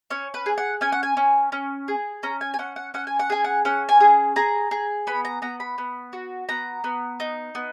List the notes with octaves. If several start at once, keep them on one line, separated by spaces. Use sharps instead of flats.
C#4 C#5
B4
G#4
F#5
C#4 G#5
F#5
G#5
C#4
C#4
G#4
C#4 A#5
G#5
G#5
C#4 F#5
F#5
C#4 F#5
G#5
F#5
G#4 G#5
F#5
C#4 F#5
G#5
G#4
G#4 A#5
G#4
B3 B5
A#5
B3 A#5
B5
B3
F#4
B3 A#5
B3
D#4
B3